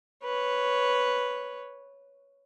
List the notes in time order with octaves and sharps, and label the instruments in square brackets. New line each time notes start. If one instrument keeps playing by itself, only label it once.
[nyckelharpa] B4 C#5